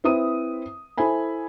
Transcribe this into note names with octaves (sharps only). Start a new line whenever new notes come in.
C4 E4 B4 E5 D#6 D#7
E4 A4 C5 E5 G#5 B5